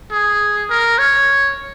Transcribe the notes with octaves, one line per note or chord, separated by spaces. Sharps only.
G#4
A#4
C#5